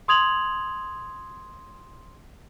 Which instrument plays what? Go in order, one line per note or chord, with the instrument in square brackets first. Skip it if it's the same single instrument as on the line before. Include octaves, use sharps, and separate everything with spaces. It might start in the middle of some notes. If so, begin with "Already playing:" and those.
[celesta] C6 D#6 G#6 F7 F#7